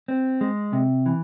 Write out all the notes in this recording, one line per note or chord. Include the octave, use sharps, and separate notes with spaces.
C4
G#3
C3
E3